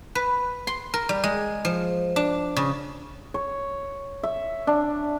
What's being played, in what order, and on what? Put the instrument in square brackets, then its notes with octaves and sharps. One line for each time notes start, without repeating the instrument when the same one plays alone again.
[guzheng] B4
C6
A#4
G3
G#3
F3
D4
C#3
[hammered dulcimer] C#5
E5
D4